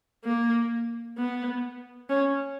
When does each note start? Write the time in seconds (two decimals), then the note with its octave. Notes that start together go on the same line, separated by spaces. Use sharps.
0.25 A#3
1.17 B3
2.09 C#4